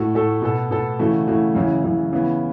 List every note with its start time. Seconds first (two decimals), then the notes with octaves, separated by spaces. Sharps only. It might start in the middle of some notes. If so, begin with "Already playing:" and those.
Already playing: A2 F#4 A4
0.15 A2 A3 F#4 A4
0.42 B2 B3 A4
0.71 B2 B3 A4
0.99 C#3 E3 A3 F#4
1.28 C#3 E3 A3 F#4
1.55 F#2 C#3 E3
1.84 F#2 C#3 E3
2.13 C#3 E3 B3